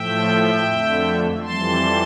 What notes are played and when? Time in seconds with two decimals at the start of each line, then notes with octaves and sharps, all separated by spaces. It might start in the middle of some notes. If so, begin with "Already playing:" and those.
Already playing: A2 F3 A3 E5 G5
0.66 F2 D3 A3
1.42 F2 E3 G3 A5 C6